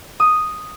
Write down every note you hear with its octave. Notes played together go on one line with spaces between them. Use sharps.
D#6